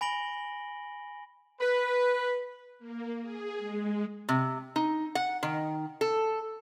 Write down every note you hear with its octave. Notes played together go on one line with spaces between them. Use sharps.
G#5 B5 A#6 D7 F#7 G7
B4
A#3
G#4
G#3
C3
D#4
F#5
D#3
A4